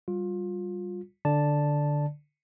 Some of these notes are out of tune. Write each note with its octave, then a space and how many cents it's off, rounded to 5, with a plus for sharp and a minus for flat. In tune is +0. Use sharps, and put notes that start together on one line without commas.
G3 -10 F4 +25
D3 +0 D5 +0 A5 +0